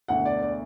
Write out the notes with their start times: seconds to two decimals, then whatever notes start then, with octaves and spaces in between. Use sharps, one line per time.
0.08 E1 D2 D3 F#5
0.25 D5
0.42 D5